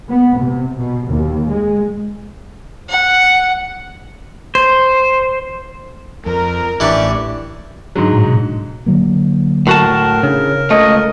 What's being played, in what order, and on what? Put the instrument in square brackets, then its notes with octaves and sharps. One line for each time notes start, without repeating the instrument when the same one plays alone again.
[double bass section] B3
C3
B2
D#2
G#3
[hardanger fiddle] F#5
[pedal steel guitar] C5
[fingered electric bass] F2 [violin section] A#4
[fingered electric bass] A1 [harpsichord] E3 D4 [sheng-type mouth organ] G4 D5 C#6
[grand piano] G#2 D3 F#3
[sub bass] A2
B2
[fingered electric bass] D3 F#3 A#3
[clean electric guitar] A2 F#4 A5 [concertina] A#4
[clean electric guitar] C#3 [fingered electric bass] D4
[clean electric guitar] C#2 A3 [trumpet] D#5